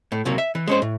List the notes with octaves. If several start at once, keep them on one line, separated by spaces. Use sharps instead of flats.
A2
C#2 C3 F#3 A#3
E5
E3
G#3 C#4 C5
A2